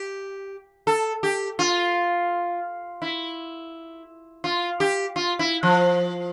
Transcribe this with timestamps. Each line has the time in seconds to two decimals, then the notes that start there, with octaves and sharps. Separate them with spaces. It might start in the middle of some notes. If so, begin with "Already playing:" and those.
Already playing: G4
0.87 A4
1.23 G4
1.59 F4
3.02 E4
4.44 F4
4.80 G4
5.16 F4
5.39 E4
5.63 F3